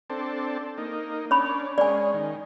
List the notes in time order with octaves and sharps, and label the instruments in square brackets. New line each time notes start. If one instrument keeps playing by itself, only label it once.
[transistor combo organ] C4 D4 A4
A#3 D#4
[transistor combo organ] C#4 D4 [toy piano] C#5 B5
[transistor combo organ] G#3 C#4 [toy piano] D5 G#5
[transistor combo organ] D#3